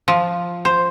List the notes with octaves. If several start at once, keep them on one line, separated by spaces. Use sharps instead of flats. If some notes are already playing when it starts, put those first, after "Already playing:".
F3
C5